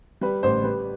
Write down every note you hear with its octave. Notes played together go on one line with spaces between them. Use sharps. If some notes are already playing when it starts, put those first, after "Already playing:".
G3 B4
A1 C5
G3 B4